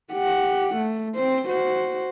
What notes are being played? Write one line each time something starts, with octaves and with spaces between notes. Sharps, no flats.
G4 F#5
A3
C4 C5
F#4 C5